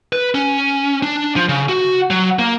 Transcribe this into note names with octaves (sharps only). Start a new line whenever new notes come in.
B4
C#4
D4
F3
C#3
F#4
F#3
A#3